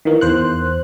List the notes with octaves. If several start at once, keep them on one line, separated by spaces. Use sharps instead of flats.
D#3 E3 A#3
E2 C5 F#6